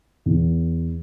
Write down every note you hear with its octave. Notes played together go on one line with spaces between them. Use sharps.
E2